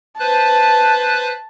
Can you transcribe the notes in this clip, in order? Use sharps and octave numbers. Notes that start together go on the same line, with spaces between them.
B4 C5 A5 F#6